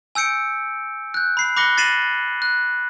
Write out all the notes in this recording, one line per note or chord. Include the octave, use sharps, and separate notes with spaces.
G#5 E6 G6 C#7 D7
F#6 G6
B5 C7
B5 D6 F#6 A#6 C#7 G7
A6 A#6 C7 D#7 E7 F#7
F#6